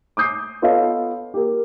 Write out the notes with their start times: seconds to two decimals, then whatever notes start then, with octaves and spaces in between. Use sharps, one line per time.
0.17 D6 D#6 G6 C7
0.62 B3 F4 A4 C#5 D#5 F5
1.34 A#3 G4